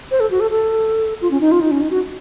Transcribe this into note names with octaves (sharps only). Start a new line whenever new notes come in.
C5
A4
F#4
A4
A4
F4
C#4
D#4
F4
D#4
C#4
D#4
F#4